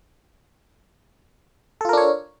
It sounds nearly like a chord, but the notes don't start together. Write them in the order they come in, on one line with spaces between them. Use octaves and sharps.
A4 F4 A#4 D4 C#5